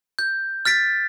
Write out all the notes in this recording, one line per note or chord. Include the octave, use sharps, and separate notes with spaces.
G6
F6 A6 B6 D7